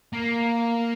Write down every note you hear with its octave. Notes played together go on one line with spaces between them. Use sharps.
A#3